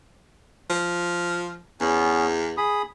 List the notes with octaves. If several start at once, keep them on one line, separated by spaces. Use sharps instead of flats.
F3
E2 B3 C#4
G#4 B5 D#6